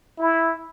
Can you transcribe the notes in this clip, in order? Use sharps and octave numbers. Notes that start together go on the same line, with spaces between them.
E4